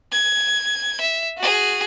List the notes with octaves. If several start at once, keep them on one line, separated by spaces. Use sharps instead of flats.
G#6
E5
F#4 G#4